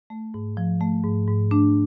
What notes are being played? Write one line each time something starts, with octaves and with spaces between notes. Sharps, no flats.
A3
G#2
F3
A3
G#2
G#2
A3 D4